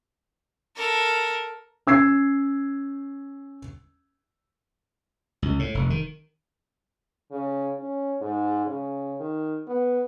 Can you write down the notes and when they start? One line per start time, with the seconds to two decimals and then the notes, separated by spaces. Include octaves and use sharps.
0.77 A4 A#4
1.87 C#4 E6 G#6 C7
5.42 C#2
5.59 A2
5.75 F1
5.90 D#3
7.31 C#3
7.80 C#4
8.21 G#2
8.67 C#3
9.20 D#3
9.68 B3